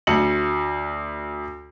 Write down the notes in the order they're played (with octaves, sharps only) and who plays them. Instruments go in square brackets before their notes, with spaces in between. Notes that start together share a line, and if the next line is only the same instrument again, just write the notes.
[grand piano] D2 C#7 F#7